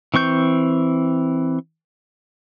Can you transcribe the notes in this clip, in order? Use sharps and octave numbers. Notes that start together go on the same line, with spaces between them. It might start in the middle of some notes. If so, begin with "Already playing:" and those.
E3 C4 C#6 G6